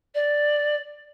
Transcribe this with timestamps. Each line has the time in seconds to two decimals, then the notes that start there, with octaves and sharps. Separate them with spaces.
0.14 D5